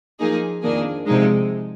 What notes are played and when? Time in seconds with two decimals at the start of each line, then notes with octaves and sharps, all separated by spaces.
0.19 F3 A#3 D#4 G#4
0.62 F2 D#3 A#3 D4 G#4
1.07 C3 F3 G#3 D#4